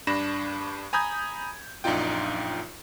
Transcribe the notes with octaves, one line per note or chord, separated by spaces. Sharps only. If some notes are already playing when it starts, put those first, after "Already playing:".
G2 D4 B5 A#6 E7
G#5 A#5 B5 D#6 G6 G#6
A#1 F#2 D4 D#4 F4 G5